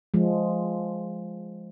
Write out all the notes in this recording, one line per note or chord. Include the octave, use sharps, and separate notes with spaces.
F3 G#3